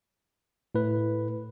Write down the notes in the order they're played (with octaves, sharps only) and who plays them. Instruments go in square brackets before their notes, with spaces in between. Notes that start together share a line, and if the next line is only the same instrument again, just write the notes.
[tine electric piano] A2 B4